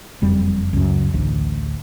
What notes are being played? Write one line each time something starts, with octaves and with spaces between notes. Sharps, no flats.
F#1 F2 G3
C#2 F#2
A1 D2